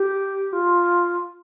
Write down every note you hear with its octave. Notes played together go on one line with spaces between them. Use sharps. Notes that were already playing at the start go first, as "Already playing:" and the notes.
Already playing: G4
F4